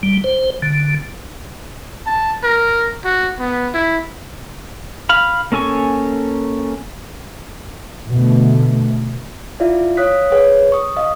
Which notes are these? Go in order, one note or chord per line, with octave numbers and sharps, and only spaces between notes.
G3
C5
D3
A5
A#4
F#4
B3
E4
F5 B5
A#3 C#4 A4 G#5 C#6
B2 D3 A3
E4 F4 D5 E5 F5
C#5 F5 D#6 F#6 B6
G#4 B4 C#5 F#5
C#6 D#6
D#5 F5 D#6